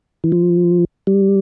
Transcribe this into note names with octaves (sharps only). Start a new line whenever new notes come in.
E3
F3
G3